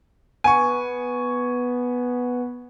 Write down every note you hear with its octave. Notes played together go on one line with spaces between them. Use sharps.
B3 G#5 C#6